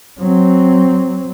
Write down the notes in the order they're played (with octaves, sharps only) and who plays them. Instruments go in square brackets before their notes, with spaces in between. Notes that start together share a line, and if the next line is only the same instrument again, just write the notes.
[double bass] F#3 C4